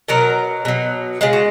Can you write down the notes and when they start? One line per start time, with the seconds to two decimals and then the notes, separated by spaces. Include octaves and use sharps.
0.08 B2 F#3 A#4
0.65 B2 F#3
1.21 C#3 G#3 G#4
1.33 F#4